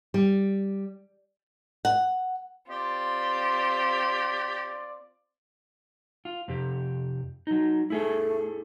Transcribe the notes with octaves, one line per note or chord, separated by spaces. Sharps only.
G3
F#5
C4 F4 G4 D5
F4
F2 C3 G4
F#3 D#4
A3 E4 G#4 A4